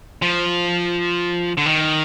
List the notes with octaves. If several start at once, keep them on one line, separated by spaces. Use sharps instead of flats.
F3
D3
D#3